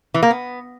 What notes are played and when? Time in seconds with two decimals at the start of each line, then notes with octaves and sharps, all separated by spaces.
0.14 E3
0.23 A#3
0.31 B3